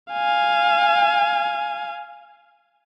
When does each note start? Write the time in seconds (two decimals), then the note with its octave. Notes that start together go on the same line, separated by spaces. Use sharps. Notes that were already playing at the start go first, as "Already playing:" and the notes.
0.12 F5 G#5